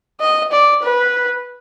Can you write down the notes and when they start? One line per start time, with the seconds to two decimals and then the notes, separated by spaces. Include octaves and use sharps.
0.20 D#5
0.52 D5
0.83 B4